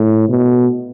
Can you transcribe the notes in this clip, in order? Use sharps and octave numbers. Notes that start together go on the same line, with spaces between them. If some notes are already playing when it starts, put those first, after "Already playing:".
Already playing: A2
B2